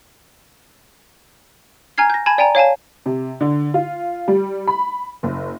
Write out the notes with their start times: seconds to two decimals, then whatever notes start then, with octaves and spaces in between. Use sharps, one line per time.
1.98 G#5 A#5 F6 G#6 C7
2.10 G6 A#6
2.26 G#5 A5 B5 G#6
2.38 D5 G5 G#5 A#5
2.55 C#5 F5 G#5 A5
3.06 C3
3.41 D3
3.74 F4
4.28 G3
4.67 B5
5.23 F#1